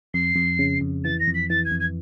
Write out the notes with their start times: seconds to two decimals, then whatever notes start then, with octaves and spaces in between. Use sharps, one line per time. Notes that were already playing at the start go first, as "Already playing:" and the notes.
0.14 F2 C7
0.36 F2
0.59 C#3
0.81 F2
1.04 E3 A6
1.19 A#6
1.27 F2
1.34 B6
1.49 E3 A6
1.65 G#6
1.71 F2
1.79 G#6